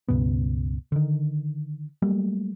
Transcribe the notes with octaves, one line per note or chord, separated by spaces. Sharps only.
C#2 G2 B2 B3
D3 D#3
F#3 G3 A3 A#3